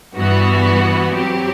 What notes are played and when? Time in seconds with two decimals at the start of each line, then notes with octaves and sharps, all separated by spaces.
0.16 G2 E3 B3 F#4
1.15 F#3 C4 G4